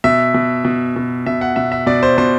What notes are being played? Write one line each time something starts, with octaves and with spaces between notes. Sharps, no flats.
B2 E5
B2
B2
B2
B2 E5
F#5
B2 E5
E5
B2 D5
C5
B2 C5